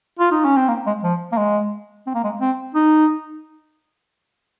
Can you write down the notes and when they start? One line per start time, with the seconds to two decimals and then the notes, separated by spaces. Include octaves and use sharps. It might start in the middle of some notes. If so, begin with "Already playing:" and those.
0.20 F4
0.32 D#4
0.45 C#4
0.57 C4
0.69 A#3
0.87 G#3
1.03 F3
1.32 A#3
1.37 G#3
2.07 C4
2.15 A#3
2.24 G#3
2.41 C4
2.75 D#4